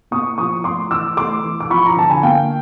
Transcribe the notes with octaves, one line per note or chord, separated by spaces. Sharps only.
A#3 C#6 D#6
F3 C#6 D#6
A3 C6 D6
E3 D6 E6
A3 C6 D6
E3
D6
F3 B5 C#6
A#5
D3 A5
G#5
A#3 F5 G5